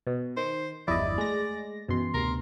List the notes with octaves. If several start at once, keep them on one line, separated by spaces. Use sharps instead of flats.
B2
D#3 C5
G1 E2 F3 E4 D5 D#5
G#3 A3 A#6
F#2 B2 E3 C6
D2 C3 A#4